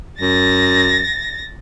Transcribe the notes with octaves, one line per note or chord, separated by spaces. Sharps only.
F#2 A6 A#6